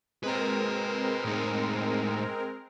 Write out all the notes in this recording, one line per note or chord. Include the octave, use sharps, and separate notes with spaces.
G#3 C4 A#4 B4 D#5
A2 D#4